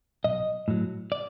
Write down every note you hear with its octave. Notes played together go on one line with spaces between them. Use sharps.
B1 D#5
A2 F#3
D5